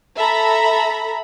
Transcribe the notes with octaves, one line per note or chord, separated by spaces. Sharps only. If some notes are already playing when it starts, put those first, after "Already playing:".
A4 E5 A#5 B5